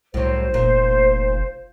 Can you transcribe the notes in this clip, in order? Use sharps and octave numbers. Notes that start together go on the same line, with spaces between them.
C2 A2 F#3 C5
F1 A#2